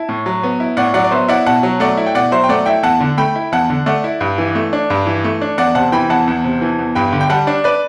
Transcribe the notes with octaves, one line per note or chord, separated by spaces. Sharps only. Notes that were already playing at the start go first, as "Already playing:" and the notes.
Already playing: E4 A5
A2
F#3
B3
E4
A2 D5 F#5
F#3 D5 F#5
D5
B3 C5 E5
E4 D5 F#5
B2 F#5 A5
F#3
A3 D5 F#5
E4
G5
B2 D5 F#5
F#3 C5 E5
G5
A3 D5 F#5
E4 E5 G5
E2 F#5 A5
D3
A3 G5 B5
E4
E2 F#5 A5
D3
A3 D5 F#5
E4
G2
E3
A3
D4
G2
E3
A3
D4
E2 D5 F#5
C3 F#5 A5
E3 G5 B5
E2 F#5 A5
E2
C3
E3
E2
G2 G5 B5
D3
G5
G3 F#5 A5
D4
B4 D5